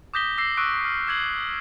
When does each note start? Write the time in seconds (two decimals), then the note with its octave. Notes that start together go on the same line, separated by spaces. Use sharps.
0.14 D6 D#6 G6 A#6 B6 G7
0.38 D6 E6 A#6 C7
0.57 C#6 D6 E6 F#6 D7
0.85 F6
1.07 D6 E6 G#6 C7 F#7